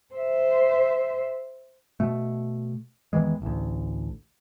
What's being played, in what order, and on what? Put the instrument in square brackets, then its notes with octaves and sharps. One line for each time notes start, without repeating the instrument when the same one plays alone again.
[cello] C5 E5
[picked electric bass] B2 A3
E2 D#3 E3 G#3
A1 D2